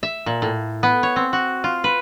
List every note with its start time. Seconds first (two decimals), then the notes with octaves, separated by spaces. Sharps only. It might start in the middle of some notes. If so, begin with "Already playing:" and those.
0.03 E5
0.26 A#2
0.42 A2
0.83 B3
1.03 C#5
1.16 C4
1.33 F#4
1.64 F4
1.84 B4